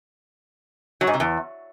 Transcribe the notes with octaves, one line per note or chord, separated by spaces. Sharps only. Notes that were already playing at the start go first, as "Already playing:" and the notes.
F#3
G#2
C3
E2